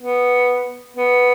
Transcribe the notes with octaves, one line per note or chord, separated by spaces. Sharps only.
B3
B3